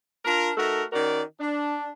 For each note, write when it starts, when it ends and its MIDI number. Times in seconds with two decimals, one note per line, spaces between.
0.25 0.51 62
0.25 0.51 65
0.25 0.51 70
0.57 0.84 57
0.57 0.84 63
0.57 0.84 66
0.57 0.84 69
0.57 0.84 70
0.93 1.22 51
0.93 1.22 61
0.93 1.22 66
0.93 1.22 70
0.93 1.22 74
1.40 1.90 62